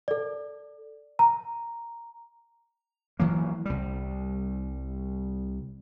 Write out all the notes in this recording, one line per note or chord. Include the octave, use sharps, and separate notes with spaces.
A4 D5
A#5
E3 F#3 A#3
C2 G3